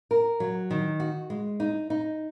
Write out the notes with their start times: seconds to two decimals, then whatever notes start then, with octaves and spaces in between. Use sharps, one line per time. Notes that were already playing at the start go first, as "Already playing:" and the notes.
0.11 A#4
0.40 F#3
0.71 D#3
1.00 F#4
1.30 G#3
1.60 D#4
1.90 D#4